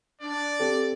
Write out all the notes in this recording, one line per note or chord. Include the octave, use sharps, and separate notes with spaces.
D4 D5
C4 G4 A4